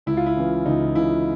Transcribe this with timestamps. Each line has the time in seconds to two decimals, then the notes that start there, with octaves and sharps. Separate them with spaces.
0.06 C#2 E4
0.17 F4
0.27 E4
0.37 C#3 E3
0.66 C#2 D#4
0.95 C#3 E3 E4